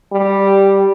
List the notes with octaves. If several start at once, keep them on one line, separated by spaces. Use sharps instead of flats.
G3